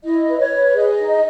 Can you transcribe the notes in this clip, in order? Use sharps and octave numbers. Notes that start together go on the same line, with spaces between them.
E4 D#5
B4
C#5
B4
G#4 D#5
D#4